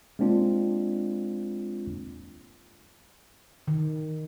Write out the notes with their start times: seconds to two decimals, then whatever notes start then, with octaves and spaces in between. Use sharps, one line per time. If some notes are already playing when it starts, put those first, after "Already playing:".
0.19 G#3 A#3 C4 D4 F4
3.68 D#3